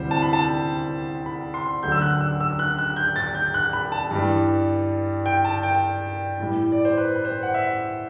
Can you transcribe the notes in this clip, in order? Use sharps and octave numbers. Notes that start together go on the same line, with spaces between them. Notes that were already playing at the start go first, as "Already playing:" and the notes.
Already playing: D2 C3 E3 G3 C5
A5
B5
A5
B5
C6
D2 D3 F#3 G6
E6
F#6
E6
E6
F#6
F#6
G6
A6
G6
F#6
B5
A5
G2 E3 G3
G5
A5
G5
A2 E3 G3
D5
C5
B4
B4
C5
F#5
E5